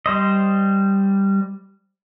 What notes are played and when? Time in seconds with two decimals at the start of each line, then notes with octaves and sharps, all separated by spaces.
0.06 G3 C5 D#5